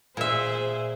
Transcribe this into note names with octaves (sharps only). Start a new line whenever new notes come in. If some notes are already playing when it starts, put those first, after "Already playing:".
A#2 G#4 C5 E5